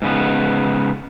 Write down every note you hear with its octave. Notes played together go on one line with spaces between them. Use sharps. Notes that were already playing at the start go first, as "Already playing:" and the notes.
G#2 C#3 B3